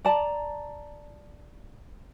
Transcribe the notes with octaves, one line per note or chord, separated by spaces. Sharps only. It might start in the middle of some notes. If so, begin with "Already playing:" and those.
D5 A5 A#5